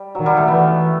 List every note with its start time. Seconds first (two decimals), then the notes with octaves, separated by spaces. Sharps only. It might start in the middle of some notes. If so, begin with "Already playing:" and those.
Already playing: G3
0.15 D#3 F#3
0.26 G3
0.37 A3
0.48 E3 B3